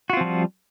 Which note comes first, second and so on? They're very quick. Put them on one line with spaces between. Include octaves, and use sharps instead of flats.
F#4 F4 C4 F3 G3